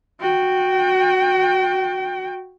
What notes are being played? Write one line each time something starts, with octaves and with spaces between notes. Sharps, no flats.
F#4 G5